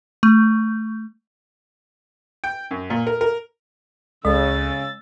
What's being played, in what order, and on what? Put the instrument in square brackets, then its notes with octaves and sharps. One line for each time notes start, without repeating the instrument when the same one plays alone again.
[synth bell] A3
[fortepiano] G5
F#2
A#2
A#4
A#4
[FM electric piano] C#2 A4 [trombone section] C#3 [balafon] G#3 [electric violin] E6 A6